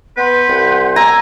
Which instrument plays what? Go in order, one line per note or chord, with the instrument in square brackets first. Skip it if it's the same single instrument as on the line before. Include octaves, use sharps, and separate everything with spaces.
[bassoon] B3 [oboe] B4 [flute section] F#5 C6 G6
[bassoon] C2
[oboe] G#5 [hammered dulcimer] A#5 [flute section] D6 E6